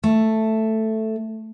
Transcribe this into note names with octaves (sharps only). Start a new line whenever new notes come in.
A3